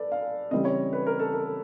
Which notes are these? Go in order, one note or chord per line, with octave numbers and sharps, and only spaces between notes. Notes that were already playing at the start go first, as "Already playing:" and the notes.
Already playing: A4 B4 D5
F5
C#3 E3 G3 C4 D#5
C#5
B4
A#4
A4
A#4